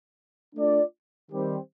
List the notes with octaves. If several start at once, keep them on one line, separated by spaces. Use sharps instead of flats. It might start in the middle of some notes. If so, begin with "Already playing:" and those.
A3 D4 F4 A4 D5
D#3 G3 C4 G4